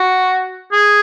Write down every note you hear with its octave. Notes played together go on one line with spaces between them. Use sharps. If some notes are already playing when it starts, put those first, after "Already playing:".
Already playing: F#4
G#4